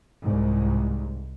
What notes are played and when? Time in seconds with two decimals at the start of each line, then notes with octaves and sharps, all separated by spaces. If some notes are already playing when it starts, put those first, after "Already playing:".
0.22 C2 G#2